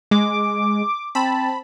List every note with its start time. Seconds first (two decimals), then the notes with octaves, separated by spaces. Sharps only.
0.11 G#3 D6
1.15 C4 A5 B5